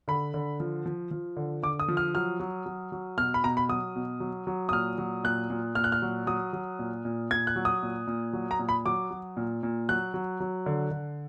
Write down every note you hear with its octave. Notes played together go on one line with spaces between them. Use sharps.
D3 B5
D3
F3
F3
F3
D3
D3 D6
D#6
F3
F6
F#3 F6
F#3
F#3
F#3
B2 F6
B5
B2 A#5
B5
F#3 D#6
B2
F#3
F#3
D#6
A#2 F6
F#3
A#2 F#6
A#2
A#2 F6
F#6
F6
F#3
F#3 D#6
F#3
A#2
A#2
A#2 G#6
F#6
F#3
D#6
A#2
A#2
F#3
A#5
A#2
B5
F#3 D6
F#3
A#2
A#2
F#3 F#6
F#3
F#3
D3
D3